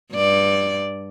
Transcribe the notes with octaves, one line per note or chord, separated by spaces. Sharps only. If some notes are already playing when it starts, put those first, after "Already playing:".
G2 D5